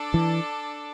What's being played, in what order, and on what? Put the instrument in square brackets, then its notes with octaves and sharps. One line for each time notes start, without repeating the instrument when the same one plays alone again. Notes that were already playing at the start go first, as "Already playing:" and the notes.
Already playing: [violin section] D4 A4 D5
[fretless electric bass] E3